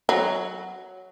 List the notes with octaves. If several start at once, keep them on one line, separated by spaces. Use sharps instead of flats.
F#3